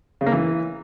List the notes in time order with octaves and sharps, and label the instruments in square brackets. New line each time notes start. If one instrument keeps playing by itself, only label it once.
[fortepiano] C#3
A#3
E3